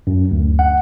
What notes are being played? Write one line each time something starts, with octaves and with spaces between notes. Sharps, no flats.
F#2
D2
F#5